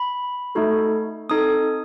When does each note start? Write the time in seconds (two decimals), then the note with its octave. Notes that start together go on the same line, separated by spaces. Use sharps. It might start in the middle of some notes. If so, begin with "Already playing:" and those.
Already playing: B5
0.55 A3 D#4 F#4 A4
1.29 C4 D#4 A4 D#6